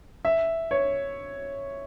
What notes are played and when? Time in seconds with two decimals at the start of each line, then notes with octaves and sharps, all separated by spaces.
0.25 E5
0.71 C#5